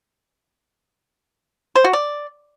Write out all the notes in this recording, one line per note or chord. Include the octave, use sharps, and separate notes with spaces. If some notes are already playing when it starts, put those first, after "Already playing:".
C5
F#4
D5